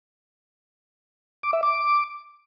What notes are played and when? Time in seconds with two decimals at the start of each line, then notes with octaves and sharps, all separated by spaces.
1.43 D6
1.53 E5
1.63 D6